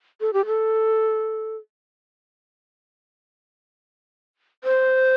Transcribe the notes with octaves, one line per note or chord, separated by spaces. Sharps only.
A4
G4
A4
C5